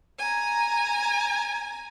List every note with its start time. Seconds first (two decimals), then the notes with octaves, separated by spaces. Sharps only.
0.19 G#5 A#5